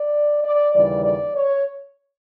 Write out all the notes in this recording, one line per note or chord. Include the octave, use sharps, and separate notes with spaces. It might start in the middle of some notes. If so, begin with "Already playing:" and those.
Already playing: D5
D5
D#2 C#3 E3 G3 D5
D5
C#5